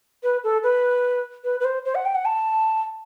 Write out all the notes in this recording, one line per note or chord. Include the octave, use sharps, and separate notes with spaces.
B4
A4
B4
B4
B4
C5
C5
F#5
G5
F#5
A5